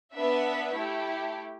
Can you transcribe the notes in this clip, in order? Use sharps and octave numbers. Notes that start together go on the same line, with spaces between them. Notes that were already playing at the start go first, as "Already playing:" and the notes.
B3 D4 B4 E5
A3 E4 G4